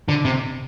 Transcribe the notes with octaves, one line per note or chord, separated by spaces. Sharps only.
D3
C3